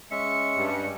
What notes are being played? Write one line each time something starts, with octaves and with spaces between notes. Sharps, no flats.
G#3 C#4 E5 C#7
G2